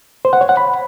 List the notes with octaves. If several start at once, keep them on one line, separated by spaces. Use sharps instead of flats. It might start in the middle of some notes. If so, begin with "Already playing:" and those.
C5
F#5
C#5
F#5
B5